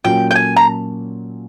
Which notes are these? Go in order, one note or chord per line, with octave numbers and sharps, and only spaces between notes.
A#2 F#3 A#3 C#4 F4 G5
G5
G#5
A#5